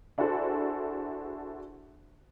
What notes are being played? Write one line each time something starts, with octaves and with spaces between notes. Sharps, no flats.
D4 E4 F#4 G#4 A4 C5